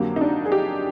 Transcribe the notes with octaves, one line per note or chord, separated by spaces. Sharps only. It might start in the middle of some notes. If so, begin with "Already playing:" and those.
Already playing: F2 D3 F#3 A#3 G4
D#4
D4
G#4
G4